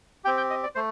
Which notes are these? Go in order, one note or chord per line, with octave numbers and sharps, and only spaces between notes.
C4 G4 G5
G5
D#5
D5
A3 C5